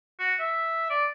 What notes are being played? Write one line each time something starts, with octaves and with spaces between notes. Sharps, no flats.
F#4
E5
D5